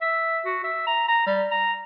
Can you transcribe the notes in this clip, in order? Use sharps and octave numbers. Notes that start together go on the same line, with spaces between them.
E5
F#4
E5
A#5
A#5
G3
A#5